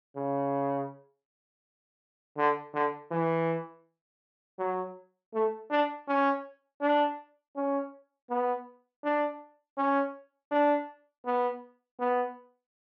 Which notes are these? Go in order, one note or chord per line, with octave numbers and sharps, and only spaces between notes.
C#3
D3
D3
E3
F#3
A3
D4
C#4
D4
C#4
B3
D4
C#4
D4
B3
B3